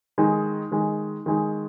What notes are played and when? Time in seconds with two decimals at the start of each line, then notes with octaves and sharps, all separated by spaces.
0.18 D#3 G#3 D#4
0.72 D#3 G#3 D#4
1.26 D#3 G#3 D#4